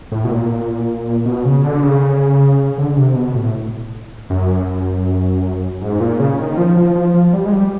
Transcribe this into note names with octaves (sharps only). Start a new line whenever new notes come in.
A2
B2
A#2
B2
C#3
D3
C#3
D3
C3
B2
A2
F#2
G#2
A#2
C#3
D#3
F3
F3
F3
F3
G3
G#3
G3